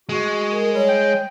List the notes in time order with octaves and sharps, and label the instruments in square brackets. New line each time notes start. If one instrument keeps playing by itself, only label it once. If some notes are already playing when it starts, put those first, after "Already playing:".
[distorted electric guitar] G#3 [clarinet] F#4
[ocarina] A#4
[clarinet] G3 [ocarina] C#5
[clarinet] G5